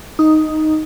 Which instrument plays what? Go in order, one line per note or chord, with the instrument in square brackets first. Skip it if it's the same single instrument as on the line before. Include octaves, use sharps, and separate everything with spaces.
[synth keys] D#4